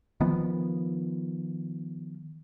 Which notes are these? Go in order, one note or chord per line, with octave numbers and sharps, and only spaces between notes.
D#3 F3 B3